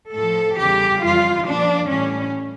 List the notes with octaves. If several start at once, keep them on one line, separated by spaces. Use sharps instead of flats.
A2 F3 A4
E2 C#3 E3 G3 G4
F2 E3 G3 F4
A#2 F3 D4
A2 E3 G3 C#4